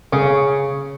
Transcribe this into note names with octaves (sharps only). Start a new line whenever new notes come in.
C#3